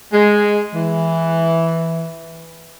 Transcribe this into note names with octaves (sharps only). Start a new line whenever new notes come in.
G#3
E3